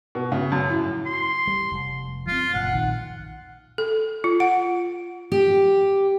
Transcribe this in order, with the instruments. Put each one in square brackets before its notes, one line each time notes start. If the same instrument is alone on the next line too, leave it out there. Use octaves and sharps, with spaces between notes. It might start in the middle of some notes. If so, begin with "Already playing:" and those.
[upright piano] B2
C#3
F#2
A2
[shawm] C6
[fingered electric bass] G3
F1
[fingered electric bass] F#3 C4 [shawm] F4
[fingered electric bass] F#1 A#2 [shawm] F#5
[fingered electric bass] A#1 D#3
[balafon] A4
F4
F#5
[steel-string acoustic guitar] G4